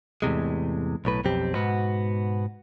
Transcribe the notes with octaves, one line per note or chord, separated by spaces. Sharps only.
E2 A2 C3 G#3
B1 A2 B4
B1 F2 C4 G4
G#2 B2 B3 F#4